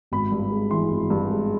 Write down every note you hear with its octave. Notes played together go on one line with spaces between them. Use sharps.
G#1 B5
G2
G#3
E3 C6
G#1
G2
G#3